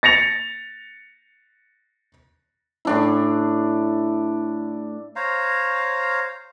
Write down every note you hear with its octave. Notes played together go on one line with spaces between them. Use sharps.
A6 A#6 C#7 F7
A2 D4 E4
C5 C#5 F5 A#5